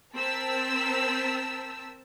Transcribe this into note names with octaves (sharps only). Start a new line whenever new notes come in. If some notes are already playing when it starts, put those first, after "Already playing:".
C4 A#4 A5 E6 B6